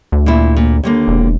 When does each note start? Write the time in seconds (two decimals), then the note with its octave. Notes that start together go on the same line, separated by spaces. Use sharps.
0.12 D2
0.26 A#2 E4
0.56 A#2
0.83 D#2 D3 A#3
1.08 E1